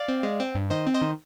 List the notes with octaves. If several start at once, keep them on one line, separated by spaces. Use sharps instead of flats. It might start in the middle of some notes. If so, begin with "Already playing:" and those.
Already playing: D5 F5
C4
G#3
C4
G2
D#3 C5 D#5
C4
C5 D#5
D#3